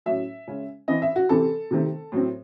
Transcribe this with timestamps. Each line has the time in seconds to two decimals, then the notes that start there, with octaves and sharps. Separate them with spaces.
0.06 A2 F#3 C#4 E5
0.47 C#3 G#3 C#4
0.88 E3 C4 D#5
1.02 E5
1.16 F#4
1.29 C3 E3 C4 A4
1.71 C3 D#3 A3 C4
2.12 A2 F#3 C4